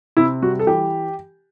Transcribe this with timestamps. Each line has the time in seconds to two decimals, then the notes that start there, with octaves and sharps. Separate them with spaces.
0.17 C3 E4
0.42 G3 F#4
0.59 A4
0.67 E3 G4